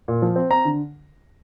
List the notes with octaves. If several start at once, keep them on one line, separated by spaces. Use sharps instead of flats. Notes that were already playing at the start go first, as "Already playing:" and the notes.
A#2
F3
C4
C4 A#5
D3